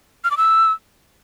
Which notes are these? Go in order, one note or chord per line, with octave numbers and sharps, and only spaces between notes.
F6
D6
E6